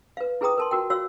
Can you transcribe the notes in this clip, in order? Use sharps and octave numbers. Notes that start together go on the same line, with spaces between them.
B4 F5
E4 G#4 B4 G5 A#5 D#6
A#4 A5 C6
F#4 A#4 G5
F#4 C#5 F5 E6